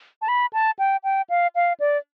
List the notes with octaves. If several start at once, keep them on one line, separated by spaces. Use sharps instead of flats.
A5
B5
A5
G5
G5
F5
F5
D5